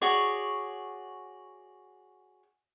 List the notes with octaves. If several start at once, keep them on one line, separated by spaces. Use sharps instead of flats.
F#4 G#4 C#5 D5